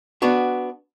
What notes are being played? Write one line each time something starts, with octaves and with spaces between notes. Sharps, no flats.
B3 D4 F#4